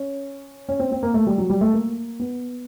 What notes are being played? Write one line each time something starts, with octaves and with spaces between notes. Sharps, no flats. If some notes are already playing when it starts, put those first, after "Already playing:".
Already playing: C#4
C#4
C4
C4
A#3
A3
G3
F#3
G3
A3
A#3
B3